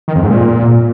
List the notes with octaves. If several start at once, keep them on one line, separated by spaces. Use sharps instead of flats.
D#3
F2
G#2
A#2